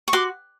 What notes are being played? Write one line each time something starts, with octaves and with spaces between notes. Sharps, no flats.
C#6
F#4 C6 D6